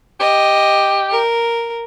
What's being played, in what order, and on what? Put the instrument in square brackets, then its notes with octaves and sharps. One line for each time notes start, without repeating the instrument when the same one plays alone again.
[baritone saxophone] G4 [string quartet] D#5
[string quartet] A#4